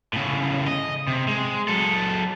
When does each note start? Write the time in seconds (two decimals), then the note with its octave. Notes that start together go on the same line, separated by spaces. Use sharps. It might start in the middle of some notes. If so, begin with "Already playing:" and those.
0.13 A2 C#3
0.67 D#5
1.07 C3
1.28 G#3
1.68 F#3 A4